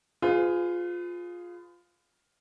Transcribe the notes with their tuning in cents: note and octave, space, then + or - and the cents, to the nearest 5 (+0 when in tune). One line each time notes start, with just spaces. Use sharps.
F4 +10 G#4 +0 B4 +40